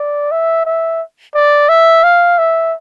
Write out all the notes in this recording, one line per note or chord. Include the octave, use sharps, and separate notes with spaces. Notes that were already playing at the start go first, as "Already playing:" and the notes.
Already playing: D5
E5
E5
D5
E5
F5
E5